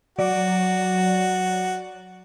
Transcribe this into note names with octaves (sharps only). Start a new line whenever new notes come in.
F#3 F#4 D5